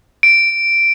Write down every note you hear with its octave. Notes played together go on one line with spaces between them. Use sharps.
D7